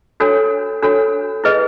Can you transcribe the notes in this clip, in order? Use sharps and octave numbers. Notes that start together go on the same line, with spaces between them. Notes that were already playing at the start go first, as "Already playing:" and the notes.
D4 F#4 A4 C#5
D4 F#4 A4 C#5
E4 G#4 B4 D#5